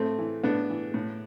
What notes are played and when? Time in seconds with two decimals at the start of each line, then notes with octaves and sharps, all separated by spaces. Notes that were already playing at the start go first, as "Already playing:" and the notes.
Already playing: A2 A3 C4
0.18 E3
0.43 A2 B3 D4
0.70 E3
0.94 A2